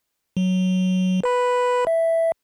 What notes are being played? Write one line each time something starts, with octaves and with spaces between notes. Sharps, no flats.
F#3
B4 B5
E5